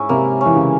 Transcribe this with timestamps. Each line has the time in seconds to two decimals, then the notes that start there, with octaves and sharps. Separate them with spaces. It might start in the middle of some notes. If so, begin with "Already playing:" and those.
Already playing: G#2 C#4 E4
0.09 C3 A#3
0.41 E3 C#4
0.56 C#3